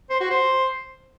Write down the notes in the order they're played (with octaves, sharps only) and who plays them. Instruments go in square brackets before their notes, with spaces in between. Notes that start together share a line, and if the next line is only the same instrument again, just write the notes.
[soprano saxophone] C5
F#4
C5